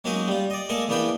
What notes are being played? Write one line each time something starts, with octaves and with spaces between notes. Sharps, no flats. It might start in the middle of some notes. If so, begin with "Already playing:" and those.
F#3 G#3 A#3 C#4 D#4 F#4
G3 F4
D5 D#5
G#3 A#3 G#4 A4 D#5
E2 A#3 B3 D4 B4 G5